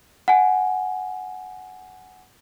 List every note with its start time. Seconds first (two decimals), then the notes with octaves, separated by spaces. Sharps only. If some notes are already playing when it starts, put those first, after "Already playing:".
0.28 F#5 G#5